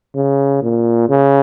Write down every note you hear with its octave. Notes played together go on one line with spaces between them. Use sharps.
C#3
A#2
C#3